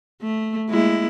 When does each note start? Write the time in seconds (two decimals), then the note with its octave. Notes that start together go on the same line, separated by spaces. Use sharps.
0.22 A3
0.69 G#3 A#3 E4